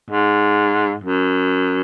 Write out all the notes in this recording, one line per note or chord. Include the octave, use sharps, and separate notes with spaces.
G#2
F#2